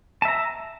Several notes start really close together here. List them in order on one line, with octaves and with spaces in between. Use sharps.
A5 E5 A#5